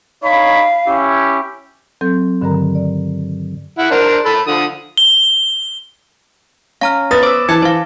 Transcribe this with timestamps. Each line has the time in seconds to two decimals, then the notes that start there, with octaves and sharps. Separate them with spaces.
0.24 D#4 C#5 F5 B5
0.88 C#4 E4 G4
2.01 F#3 C4 A4 G6
2.42 G2 D3 D#3 F#3 A#4 A#5
2.75 D5
3.79 E4 F#5
3.91 D4 A#4 C5
4.26 A4 B5
4.47 D3 F3 D#6
4.97 G7
6.81 C#4 F5 A#5 F6
7.11 B3 B4 D#6 A6 A#6
7.23 C5 D6 E6
7.49 E3 A5 G#6 C#7
7.62 E3 C5 F5